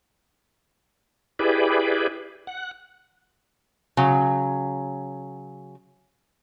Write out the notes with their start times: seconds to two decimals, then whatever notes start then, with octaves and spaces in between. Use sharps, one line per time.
1.39 E4 G4 G#4 B4 D5
2.47 F#5
3.97 C#3 F#3